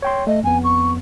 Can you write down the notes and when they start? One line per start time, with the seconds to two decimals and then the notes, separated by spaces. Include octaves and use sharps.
0.02 C#5 G5 C6
0.27 A3 D#5
0.43 F2 B3 G#5
0.63 C#6